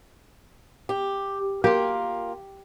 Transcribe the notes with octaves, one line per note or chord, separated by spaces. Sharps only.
G4
A#3 F4 G4